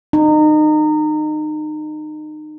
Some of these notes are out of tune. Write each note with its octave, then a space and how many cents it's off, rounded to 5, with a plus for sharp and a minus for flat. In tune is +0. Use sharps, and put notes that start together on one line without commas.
D#4 -30